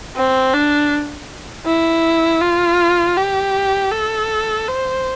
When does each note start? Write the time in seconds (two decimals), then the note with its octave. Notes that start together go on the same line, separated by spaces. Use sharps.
0.16 C4
0.53 D4
1.66 E4
2.41 F4
3.17 G4
3.91 A4
4.68 C5